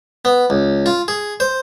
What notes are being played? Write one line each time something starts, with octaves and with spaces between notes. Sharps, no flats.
B3
C#2
F4
G#4
C5